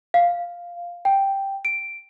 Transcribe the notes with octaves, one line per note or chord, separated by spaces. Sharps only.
F5
G5
D7